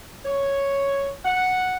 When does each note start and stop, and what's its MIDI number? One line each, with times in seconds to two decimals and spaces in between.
0.25 1.11 73
1.25 1.77 78